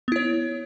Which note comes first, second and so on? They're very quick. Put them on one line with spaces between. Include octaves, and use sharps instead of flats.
B3 E4 C#5